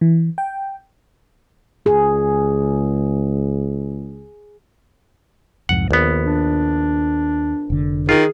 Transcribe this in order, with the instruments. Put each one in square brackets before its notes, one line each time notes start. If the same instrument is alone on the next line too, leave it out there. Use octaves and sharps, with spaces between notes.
[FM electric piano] E3
G5
[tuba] C#2 [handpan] G#4
[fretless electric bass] C2 F2 G#2 [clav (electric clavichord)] F#5
[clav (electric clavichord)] A#1 B3 [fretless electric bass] D#2
[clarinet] D4
[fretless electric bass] F1 D3
[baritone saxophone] D#3 [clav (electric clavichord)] F4 [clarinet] G#4